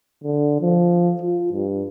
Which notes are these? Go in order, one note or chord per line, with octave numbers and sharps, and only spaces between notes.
D3
F3
F4
G2